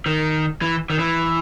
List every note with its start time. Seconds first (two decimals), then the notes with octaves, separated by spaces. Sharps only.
0.06 D#3
0.62 E3
0.90 D#3
0.99 E3